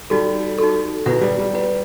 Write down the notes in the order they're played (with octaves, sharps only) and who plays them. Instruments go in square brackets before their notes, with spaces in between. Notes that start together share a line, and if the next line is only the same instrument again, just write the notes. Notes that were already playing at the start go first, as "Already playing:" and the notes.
[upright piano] G3 [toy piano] D#4 F#4 A4
[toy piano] D#4 F#4 A4
[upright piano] B2 [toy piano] E4 B4 F#5
[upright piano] G3
G3
[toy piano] E4 B4 F#5